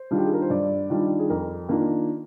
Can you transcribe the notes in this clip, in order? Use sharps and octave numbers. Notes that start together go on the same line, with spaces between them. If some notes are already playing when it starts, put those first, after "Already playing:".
Already playing: C5
D#3 G3 D4 F4
G4
G#4
A#4
C5
G2 D5
D#3 G3 D4 F4
G#4
F2 A#4
D#3 A#3 D4 F4